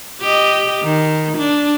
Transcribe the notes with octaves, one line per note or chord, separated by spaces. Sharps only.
G4 D#5
D#3
D4